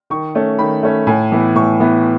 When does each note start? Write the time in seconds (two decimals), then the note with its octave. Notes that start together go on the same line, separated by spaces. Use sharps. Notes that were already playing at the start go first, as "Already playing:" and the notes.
0.10 D#3 C#6
0.35 A3 C#4
0.59 D#3 B5
0.83 A3 C#4
1.07 A2 G#5
1.32 E3 B3
1.55 A2 C#6
1.80 E3 B3